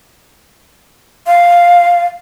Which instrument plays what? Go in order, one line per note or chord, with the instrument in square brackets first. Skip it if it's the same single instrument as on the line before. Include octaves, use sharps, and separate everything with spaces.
[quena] F5